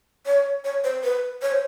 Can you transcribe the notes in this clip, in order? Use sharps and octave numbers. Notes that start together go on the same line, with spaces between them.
C#5
C#5
C5
B4
C#5
C5